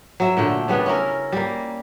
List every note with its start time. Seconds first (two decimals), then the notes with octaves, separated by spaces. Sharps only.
0.20 F#3 E5
0.37 A#2 D3 A3 G5
0.68 C#3 G3 B3 D4
0.86 C#4 E4 A#4
1.32 G3 A#3